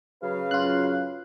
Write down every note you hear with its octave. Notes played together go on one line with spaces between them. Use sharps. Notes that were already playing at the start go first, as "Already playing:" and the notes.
C#3 F#3 B4 F5
F#2 F4 F#6